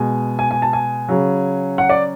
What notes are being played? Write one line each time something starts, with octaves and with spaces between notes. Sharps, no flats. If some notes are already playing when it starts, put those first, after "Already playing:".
Already playing: B2 G#3 G#5
G#5
G#5
A5
G#5
C#3 F#3
F#5
D5